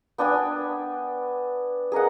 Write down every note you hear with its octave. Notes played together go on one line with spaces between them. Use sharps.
B3 D4 G5 G#5
G#4 A#4 D#5 F#5